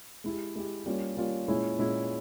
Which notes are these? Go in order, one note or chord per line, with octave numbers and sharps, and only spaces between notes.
G#3 E4 G4
G#3 E4 G4
G3 A#3 C#4 F4
G3 A#3 C#4 F4
A#2 G#3 C#4 E4
A#2 G#3 C#4 E4